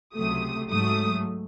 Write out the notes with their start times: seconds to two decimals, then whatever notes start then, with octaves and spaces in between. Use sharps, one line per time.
0.15 C#2 C3 F#3 A3 D#6
0.71 G#2 F#3 A3 D#6